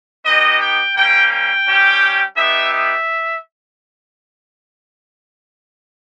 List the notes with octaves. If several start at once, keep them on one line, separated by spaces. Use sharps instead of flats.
B3 D#4 G4 D#5
G5
G3 A#3 C#4 G5
G5
G3 C#4 G4
B3 D#4 G4 E5
E5